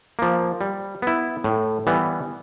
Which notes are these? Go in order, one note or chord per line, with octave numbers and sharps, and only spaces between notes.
F3 A#3
G3
B3 E4
A2
E3 G3 B3